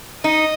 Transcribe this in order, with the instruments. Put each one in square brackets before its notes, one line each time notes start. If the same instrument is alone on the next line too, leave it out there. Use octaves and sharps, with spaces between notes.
[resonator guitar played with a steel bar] D#4 [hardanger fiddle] D#5